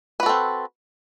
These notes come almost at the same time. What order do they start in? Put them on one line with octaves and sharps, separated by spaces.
B4 F#4 A4 C4